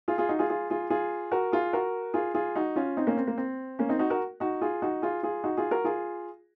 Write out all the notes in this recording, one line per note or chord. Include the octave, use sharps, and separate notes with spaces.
F4 G#4
F4 G#4
D#4 F#4
F4 G#4
F4 G#4
F4 G#4
F4 G#4
F#4 A#4
F4 G#4
F#4 A#4
F4 G#4
F4 G#4
D#4 F#4
C#4 F4
C4 D#4
A#3 C#4
C4
A#3
C4
A#3 C#4
C4 D#4
D#4 F#4
F#4 A#4
D#4 F#4
F4 G#4
D#4 F#4
F4 G#4
F4 G#4
D#4 F#4
F4 G#4
F#4 A#4
F4 G#4